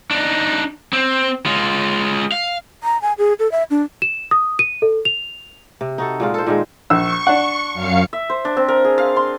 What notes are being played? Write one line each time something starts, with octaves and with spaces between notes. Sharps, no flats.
D4 D#4
C4
G#3 F4
F5
A#5
G#5
G#4
A4
E5
D4
E7
D#6
D#7
A4
F7
C3
D#4 F#4 A4
A#2 G#3 F4
A4 C5
A#2 D#3 G#3
A#1 C#6 E6
D4 F#5
F#2 F5 C#7
E5
C5
D4
C4
A#4
G#4
F5
C6